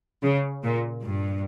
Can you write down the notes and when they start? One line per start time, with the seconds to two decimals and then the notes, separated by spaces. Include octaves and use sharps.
0.23 C#3
0.63 A#2
1.05 G2